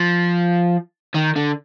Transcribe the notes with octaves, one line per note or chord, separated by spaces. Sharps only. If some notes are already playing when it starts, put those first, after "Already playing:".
Already playing: F3
D#3
D3